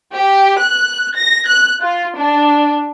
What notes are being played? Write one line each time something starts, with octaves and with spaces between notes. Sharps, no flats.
G4
F#6
A#6
F#6
F4
D4